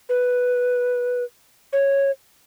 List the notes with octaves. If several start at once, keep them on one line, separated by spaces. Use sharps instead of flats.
B4
C#5